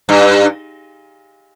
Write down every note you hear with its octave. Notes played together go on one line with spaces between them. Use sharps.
G2